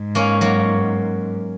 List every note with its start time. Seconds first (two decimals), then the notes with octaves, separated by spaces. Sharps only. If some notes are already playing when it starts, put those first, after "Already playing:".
Already playing: G#2
0.15 A#3 C#4
0.41 F#3 A#3